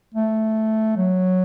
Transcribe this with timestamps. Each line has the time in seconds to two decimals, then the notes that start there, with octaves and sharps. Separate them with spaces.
0.14 A3
0.97 F#3